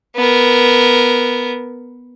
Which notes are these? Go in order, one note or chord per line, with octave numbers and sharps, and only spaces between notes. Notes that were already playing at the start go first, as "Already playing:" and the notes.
B3 A#4